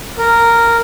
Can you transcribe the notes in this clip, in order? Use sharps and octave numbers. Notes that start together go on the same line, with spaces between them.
A#4